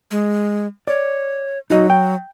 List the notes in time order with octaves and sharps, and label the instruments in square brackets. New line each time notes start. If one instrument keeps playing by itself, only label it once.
[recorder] G#3
[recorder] C#5 [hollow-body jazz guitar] D5
[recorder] F#3 [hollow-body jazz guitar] D#4 F#4 D#5
[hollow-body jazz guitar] G5